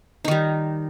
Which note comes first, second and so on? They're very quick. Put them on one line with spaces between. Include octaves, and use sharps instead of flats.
D#4 D#3 G3